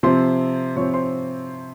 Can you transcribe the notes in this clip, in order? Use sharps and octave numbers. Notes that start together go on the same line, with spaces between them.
C3 F3 C4 C5 C6
C3 F3 C4 C#5 C#6
C5 C6